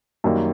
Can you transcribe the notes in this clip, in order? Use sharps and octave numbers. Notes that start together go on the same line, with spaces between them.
F#2 D#3 G3 A#3